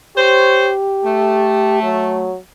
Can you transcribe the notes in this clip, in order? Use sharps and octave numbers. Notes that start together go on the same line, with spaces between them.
G4 C5 C#5
A3
F#3